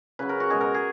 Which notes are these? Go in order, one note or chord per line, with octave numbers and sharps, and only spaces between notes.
C#3 F#3 B4
A#4
F#4
B2 G#3 G#4
A#4
G#4